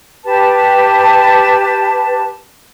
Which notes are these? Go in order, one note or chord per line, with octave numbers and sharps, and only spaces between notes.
G4 B4 A5